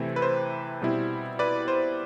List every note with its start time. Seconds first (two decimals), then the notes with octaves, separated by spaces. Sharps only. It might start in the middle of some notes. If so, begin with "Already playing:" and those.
Already playing: C3 E3 A3 C4 E4
0.16 B4
0.22 C5
0.82 B2 G3 C4 E4
1.39 B4 D5
1.68 C5